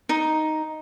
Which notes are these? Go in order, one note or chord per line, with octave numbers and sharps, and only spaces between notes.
D#4